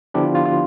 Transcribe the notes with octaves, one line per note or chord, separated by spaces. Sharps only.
D3 F3 B3 D4 E4 G4
F4
F4
F4